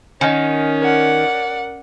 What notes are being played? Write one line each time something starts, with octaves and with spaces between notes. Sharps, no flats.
D#3 C#4 D#5 F#5 G#5
A#4 D5 F#5